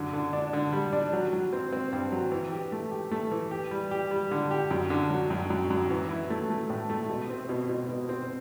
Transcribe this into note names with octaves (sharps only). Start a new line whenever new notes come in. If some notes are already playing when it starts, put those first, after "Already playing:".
Already playing: F#2 D3
D3
D4
D3
G3
D4
F#3
F#3
C4
C4
G2
F#3
E3
G4
A3
G4
A3
E3
G4
G3
G4
G3
D3
G4
F#2
D3
F#3
F#2
F#2
F#2
E3
E4
A3
A3
A2
A3
B2
C4
B2
B2
B2
C4